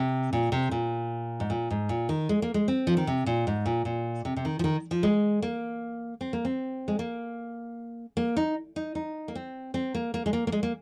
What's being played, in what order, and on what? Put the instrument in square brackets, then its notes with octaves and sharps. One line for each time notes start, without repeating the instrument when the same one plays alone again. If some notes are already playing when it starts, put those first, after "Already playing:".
Already playing: [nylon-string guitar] C3
A#2
C3
A#2
G#2
A#2
G#2
A#2
D#3
G#3
A#3
G#3
C4
F3
D#3
C3
A#2
G#2
A#2
A#2
C3
C3
D#3
F3
D#3
F3
G#3
A#3
C4
A#3
C4
G#3
A#3
A#3
D#4
D#4
D#4
A#3
C4
C4
A#3
A#3
G#3
A#3
A#3
G#3
A#3